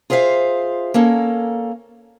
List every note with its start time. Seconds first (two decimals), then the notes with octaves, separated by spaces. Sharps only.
0.10 F4 G#4 C5 E5 F5
0.94 A#3 C#4 A4 A#4